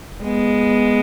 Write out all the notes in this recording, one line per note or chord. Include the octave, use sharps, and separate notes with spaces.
G#3 B3